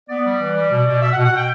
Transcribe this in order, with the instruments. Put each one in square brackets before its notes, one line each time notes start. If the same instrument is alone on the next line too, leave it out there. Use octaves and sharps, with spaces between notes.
[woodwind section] B3 D5
G3
E3
G3
B2
B2
B2 E5
F#5
B2
F#5
B2 G5